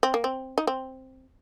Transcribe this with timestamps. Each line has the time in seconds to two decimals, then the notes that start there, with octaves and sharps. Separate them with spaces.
0.03 C4
0.14 A#3
0.24 C4
0.58 D#4
0.67 C4